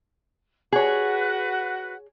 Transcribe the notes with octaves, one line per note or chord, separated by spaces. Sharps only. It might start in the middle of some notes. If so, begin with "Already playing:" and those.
F#4 G#4 B4 C#5 F#5